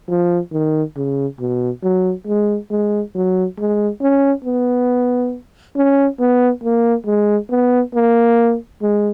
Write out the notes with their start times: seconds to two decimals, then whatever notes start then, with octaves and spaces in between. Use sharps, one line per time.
0.09 F3
0.52 D#3
0.96 C#3
1.40 B2
1.83 F#3
2.27 G#3
2.71 G#3
3.15 F#3
3.58 G#3
4.02 C#4
4.45 B3
5.76 C#4
6.20 B3
6.64 A#3
7.07 G#3
7.50 B3
7.95 A#3
8.82 G#3